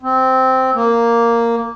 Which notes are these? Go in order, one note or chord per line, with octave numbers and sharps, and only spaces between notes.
C4
A#3